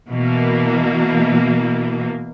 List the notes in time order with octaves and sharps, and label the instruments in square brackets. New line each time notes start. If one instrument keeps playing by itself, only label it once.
[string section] B2 E3 A#3